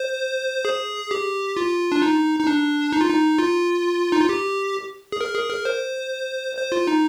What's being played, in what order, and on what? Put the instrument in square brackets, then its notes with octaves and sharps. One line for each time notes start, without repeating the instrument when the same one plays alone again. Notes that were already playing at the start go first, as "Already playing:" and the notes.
Already playing: [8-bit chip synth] C5
G#4
G4
F4
D4
D#4
D#4
D4
D#4
F4
D#4
F4
D#4
F4
G4
G#4
A#4
G#4
A#4
C5
C5
F4
D#4